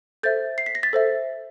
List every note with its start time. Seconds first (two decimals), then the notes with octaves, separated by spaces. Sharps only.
0.23 A4 C5 E5 G6 A6
0.58 C7
0.66 B6
0.75 A#6
0.83 A6 B6
0.93 A4 C5 E5